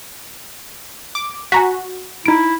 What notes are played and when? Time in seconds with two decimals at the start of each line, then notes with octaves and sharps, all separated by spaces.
1.15 D6
1.52 F#4 G#5 A#5 B6
2.26 D#4 E4 D7